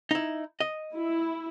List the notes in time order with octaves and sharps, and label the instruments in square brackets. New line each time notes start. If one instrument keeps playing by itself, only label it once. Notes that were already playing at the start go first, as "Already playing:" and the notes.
[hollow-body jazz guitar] D#4 E4
D#5
[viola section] E4